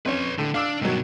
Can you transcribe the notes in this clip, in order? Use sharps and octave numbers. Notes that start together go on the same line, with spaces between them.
F2 C#4 B4 C#5
A2 D3
D4 F5 D6 E6
G2 B2 D#3 F#3